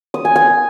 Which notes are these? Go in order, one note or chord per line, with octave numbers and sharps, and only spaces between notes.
D#6
G#5
G#5